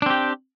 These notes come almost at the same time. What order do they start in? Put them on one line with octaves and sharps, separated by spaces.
D4 C4 G4